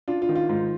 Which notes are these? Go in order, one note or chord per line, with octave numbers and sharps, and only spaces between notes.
D4 F4
F4
D#3
F4
G#2 F4